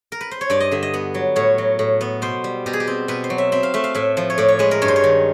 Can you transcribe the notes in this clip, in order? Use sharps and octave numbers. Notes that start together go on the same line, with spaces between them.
A#4
B4
C5
C#5
G2 D5
D#5
D3 E5
D#5
B3
F#3
A2 C#5
F#3
A2
B3
B2 C5
G3
B2 G4
G#4
G4
C4
B2 B4
C5
F#3
E5
C4 E5
F5
A3 E5
F5
A2 E5
F3
C#5
A2 D5
C#5
G#3 B4
A#4
G2 C#5
C5
C#5
D#3